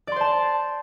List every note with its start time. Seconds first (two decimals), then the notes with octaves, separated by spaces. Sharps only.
0.07 D5
0.12 C6
0.16 C5
0.21 A5